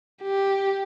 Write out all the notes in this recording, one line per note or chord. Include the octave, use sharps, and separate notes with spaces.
G4